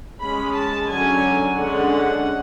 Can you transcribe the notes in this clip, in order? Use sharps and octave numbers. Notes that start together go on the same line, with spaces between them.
G#3 C#4 B5
A5
D3 F#3 C#4 G#5
D3 G#3 C#4 F#5